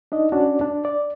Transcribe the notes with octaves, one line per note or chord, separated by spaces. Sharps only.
D4 D#4 D#5
C#4 D4 F#4 D5
D4
D5